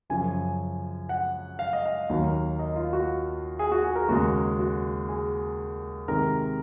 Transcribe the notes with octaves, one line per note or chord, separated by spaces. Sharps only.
F#2 C#3 F3 G#5
F#5
F5
D#5
F5
D#2 D#3 F#3 A#3
D#5
F4
F#4
G#4
F#4
G#4
A#4
D#2 C#3 G#3 F#4
F#4
G#4
C3 D#3 G#3 A#4